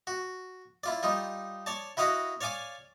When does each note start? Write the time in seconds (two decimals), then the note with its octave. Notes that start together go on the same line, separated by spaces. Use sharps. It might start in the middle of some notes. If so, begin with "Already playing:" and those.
0.07 F#4
0.84 E4 F4 D5
1.03 G3 D#4 F4
1.66 C#5 D5 A5
1.97 E4 F#4 D#5 F5 F#5 B5
2.41 C#5 D5 F5 G#5 D6